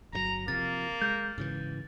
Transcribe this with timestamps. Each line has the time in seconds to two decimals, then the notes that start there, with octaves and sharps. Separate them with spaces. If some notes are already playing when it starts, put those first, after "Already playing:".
0.13 G1 C3 F#3 A#5
0.48 C3 F3 A#3 A6
1.02 G#3 G6
1.38 G#2 C#3 E3